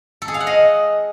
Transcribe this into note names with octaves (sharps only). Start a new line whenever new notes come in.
A4
G#4
F5
F#5
D#5